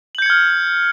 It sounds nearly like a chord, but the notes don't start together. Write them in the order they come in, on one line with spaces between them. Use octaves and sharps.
F#7 G6 C#7 G#6 F6